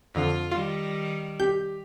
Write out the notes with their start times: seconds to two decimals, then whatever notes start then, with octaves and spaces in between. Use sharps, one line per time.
0.15 F2 D3 F4
0.51 D#3 G3 F4
1.40 G4 G6